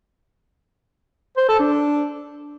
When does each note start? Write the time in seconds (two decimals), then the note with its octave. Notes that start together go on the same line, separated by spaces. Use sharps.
1.37 C5
1.48 A4
1.60 D4